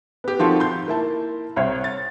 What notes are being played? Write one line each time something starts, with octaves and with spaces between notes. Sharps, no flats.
B3 G4
D#3 F3 C4 F4 F#4 A4
C6 G6
A#3 E4 A5
C2 C5 C#5
A6